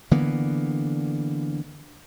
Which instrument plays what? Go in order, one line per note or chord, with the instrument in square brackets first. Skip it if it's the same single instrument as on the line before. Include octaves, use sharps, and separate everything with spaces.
[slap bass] D3 E3 A#3 B3